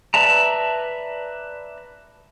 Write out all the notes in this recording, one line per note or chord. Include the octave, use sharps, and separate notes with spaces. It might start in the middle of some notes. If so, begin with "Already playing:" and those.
B4 D5 E5 A5 A#5